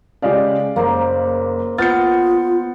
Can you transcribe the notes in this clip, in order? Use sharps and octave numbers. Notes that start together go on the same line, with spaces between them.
C#3 G#3 G4 D5 D#5 F5
F#1 A#3 C5
B3 F4 F6 G6 A6 C#7